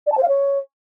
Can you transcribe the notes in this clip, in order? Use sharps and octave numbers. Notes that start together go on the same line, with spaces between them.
D5
A5
C5
F5
C#5